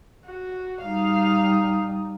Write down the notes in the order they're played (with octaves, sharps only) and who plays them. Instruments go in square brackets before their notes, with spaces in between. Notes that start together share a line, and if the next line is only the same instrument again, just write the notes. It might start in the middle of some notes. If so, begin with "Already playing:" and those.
[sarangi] F#4
[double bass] G3 D#4 [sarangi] F5